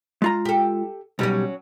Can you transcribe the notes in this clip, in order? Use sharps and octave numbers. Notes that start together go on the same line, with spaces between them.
G#3 F4 A#5
G4 A4
B1 F#3 G3 C#4